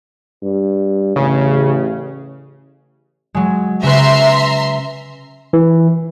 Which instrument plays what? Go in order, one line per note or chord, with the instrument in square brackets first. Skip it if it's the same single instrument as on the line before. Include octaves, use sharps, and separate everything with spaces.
[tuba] G2
[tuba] A1 [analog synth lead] C#3
[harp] F#3 G#3
[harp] C#3 B4 [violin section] E5 A#5 C6
[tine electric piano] E3